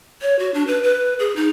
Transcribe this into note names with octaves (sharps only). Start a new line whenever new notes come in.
C#5
F#4
D4
B4
B4
G#4
D#4